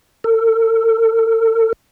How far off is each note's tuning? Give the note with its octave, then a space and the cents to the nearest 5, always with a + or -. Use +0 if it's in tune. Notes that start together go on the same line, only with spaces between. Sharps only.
A4 +45